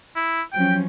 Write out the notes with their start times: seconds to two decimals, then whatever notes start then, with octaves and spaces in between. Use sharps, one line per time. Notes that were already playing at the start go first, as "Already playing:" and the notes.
0.16 E4
0.53 F3 F#3 C#4 G5